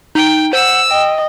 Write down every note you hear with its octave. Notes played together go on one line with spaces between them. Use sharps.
D#4 G5
C5 F#5 E6
D#5 G5